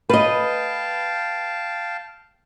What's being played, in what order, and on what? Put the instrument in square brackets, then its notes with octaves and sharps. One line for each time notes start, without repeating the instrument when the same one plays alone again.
[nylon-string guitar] B4 D#5 [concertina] F5 G5 A5